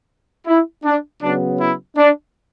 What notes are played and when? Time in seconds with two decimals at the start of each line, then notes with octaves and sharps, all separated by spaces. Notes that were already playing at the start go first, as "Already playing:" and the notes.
0.47 E4
0.84 D4
1.21 C#3 F#3 B3 D4
1.59 E4
1.97 D4